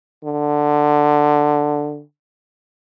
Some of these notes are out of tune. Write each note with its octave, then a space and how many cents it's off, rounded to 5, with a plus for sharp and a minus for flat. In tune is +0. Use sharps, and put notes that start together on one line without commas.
D3 +10